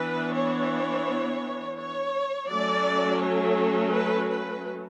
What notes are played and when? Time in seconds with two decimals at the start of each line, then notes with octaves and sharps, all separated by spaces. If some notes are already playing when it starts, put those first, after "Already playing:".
Already playing: E3 B3 D4 B4
0.34 C#5
1.79 C#5
2.49 F#3 A3 C#4 D5
3.22 C#5
3.93 B4
4.29 B4